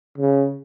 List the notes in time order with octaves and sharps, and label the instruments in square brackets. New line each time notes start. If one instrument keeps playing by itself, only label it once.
[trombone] C#3